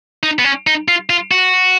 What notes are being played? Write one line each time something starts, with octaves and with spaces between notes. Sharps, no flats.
D#4
B3
C#4
D#4
F4
F4
F#4